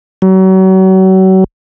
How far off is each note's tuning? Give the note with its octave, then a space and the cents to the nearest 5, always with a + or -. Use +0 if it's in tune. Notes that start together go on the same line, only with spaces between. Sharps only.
F#3 +35